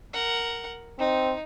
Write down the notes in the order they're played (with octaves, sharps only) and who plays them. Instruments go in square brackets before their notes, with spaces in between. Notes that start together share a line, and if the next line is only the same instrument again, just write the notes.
[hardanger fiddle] A#4 F#5
[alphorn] C4 [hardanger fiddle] D#4